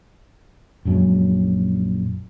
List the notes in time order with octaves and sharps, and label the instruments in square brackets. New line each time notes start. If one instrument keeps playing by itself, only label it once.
[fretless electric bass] A#1 F#2 F#3 G#3